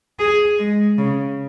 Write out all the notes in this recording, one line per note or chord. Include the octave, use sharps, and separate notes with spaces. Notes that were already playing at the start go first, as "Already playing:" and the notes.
G#4
G#3
C#3